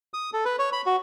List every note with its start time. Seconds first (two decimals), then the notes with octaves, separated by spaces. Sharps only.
0.14 D#6
0.33 A4
0.45 B4
0.59 C#5
0.73 B5
0.86 F#4